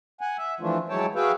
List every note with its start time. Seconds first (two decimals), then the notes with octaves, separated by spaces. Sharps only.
0.21 F#5 G#5
0.37 E5
0.60 E3 F3 A3 D4 F4
0.89 F#3 G#3 E4 C#5 G5 A5
1.15 F#4 G#4 B4 E5 F5 G5